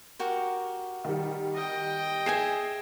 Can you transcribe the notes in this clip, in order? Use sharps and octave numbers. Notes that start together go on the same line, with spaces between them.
F#4 G4 A#4
D#3 G3
D#5 G5
G#4 E5 G#5 C7 E7